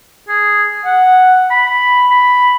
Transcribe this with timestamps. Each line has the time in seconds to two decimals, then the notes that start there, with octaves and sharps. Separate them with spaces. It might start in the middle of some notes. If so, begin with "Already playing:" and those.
0.28 G#4
0.85 F#5
1.50 B5
2.11 B5